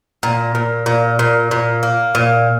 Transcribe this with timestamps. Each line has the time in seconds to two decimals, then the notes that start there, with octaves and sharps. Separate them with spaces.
0.23 A#2
0.55 A#2
0.86 A#2
1.19 A#2
1.51 A#2
1.83 A#3
2.15 A#2